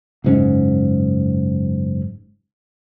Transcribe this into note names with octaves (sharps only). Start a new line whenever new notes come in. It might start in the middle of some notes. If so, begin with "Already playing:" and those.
F#1 G#2 C#4